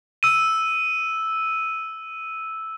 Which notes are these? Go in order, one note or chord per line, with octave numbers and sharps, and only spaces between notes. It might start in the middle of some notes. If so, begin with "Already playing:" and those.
E6 D#7